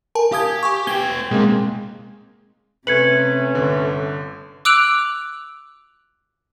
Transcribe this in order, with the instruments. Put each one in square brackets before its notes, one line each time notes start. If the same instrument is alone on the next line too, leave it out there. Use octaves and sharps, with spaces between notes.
[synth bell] A#4 G#5 A5
[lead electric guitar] G4 [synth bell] F5 D#6 G#6
[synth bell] G#5 C#6
[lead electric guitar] B3 G5 [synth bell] G#6 G7
[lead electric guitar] B1 C4 [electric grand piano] G#3 A#3
[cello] C3 [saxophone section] A3 B3 C#4 [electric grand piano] B4 [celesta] G#6 C#7 F#7
[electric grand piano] G1 D3
[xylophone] D6 E6 F#6 D7 F7 F#7